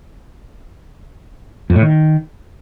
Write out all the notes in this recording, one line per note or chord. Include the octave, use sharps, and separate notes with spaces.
F2
A2
D#3